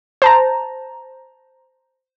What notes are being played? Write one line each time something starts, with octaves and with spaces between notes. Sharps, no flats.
C5 A5 A#5